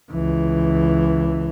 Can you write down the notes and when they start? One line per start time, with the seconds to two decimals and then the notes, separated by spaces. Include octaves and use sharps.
0.11 C#2 E3